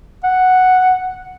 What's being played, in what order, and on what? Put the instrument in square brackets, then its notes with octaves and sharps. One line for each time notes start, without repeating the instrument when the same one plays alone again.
[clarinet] F#5